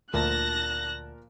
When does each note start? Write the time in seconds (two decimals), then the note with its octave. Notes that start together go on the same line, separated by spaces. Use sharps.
0.13 D2 A#2 F3 A#4 A5 F#6 A#6